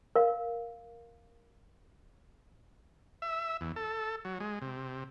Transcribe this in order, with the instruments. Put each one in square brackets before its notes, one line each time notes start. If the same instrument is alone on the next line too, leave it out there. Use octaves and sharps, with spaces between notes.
[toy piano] A#4 F5
[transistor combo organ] E5
E2
A4
F#3
G#3
C3